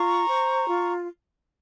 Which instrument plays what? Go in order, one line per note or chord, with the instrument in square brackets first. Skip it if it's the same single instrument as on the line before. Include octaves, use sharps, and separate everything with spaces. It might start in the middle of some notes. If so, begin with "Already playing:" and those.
Already playing: [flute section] F4 A#5 C#6
C5
F4